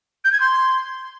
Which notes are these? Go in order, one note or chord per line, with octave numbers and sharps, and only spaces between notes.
G6
G#6
C6